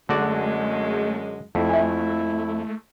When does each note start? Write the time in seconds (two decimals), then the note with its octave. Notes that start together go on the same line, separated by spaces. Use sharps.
0.09 F#2 D3 G#3 A3 F#4 D5
1.55 F2 A3 E4
1.69 E5 G#5